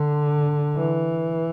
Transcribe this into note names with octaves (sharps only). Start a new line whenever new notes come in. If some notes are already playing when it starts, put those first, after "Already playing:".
Already playing: D3
E3